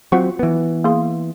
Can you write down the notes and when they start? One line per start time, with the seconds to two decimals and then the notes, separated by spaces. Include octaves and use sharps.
0.12 F#3 C4 F4 F#5 C#6
0.39 E3 B3
0.84 A#3 G#4 C6